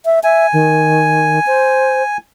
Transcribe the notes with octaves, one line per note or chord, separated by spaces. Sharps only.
E5
E5 G#5
D#3
C5